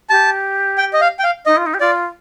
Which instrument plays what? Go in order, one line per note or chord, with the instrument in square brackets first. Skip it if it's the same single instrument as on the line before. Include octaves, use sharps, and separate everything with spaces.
[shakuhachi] G4 [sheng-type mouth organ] A5
[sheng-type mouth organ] G5
D#5
F5
G5
F5
[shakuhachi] D#4 [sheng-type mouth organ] D#5
[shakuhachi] F4
D#4
G4
[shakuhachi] F4 [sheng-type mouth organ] D5